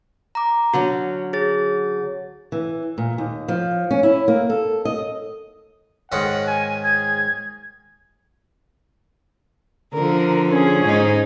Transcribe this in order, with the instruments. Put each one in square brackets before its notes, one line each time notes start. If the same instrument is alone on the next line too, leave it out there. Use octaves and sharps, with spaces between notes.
[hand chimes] A#5 D6
[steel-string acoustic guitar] D3 F#3 C#4 [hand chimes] F#4
[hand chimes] G#4 C#5 A6
[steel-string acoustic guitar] E3
A#2
D#2
F3
C#4
E4
A#3
A4
D#5
[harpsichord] G#2 D#3 C#4 [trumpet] F#5
[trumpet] G#5
[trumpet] G#4 [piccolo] G#6
[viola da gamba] D3 F3 [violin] A#4
[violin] C#4 G#4
[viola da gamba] G#2 D#4